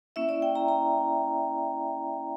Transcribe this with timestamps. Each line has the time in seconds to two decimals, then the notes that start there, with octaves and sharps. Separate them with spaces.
0.16 A#3 C#4 E4 E5
0.29 D5
0.42 G5
0.55 A#5
0.68 A#5